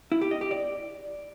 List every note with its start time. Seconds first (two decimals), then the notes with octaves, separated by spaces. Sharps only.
0.12 E4
0.21 G4
0.31 D#5
0.41 G4
0.51 D5